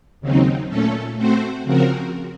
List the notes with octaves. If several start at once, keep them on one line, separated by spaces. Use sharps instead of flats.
D#2 C#3 F#3 C4 D#4
A#2 A3 C#4 A4
A3 C4 F#4 C5
C#3 F3 C4 F#4 A#4